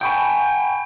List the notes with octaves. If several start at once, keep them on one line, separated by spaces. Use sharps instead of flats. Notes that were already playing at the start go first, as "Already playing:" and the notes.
G5 G#5 B5 C#6 G6